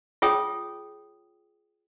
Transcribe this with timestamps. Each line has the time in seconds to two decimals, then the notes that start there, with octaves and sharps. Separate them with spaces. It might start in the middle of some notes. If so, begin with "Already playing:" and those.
0.22 F4 G#4 C#5 G5 D#6